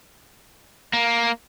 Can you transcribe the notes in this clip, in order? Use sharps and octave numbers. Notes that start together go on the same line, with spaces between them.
A#3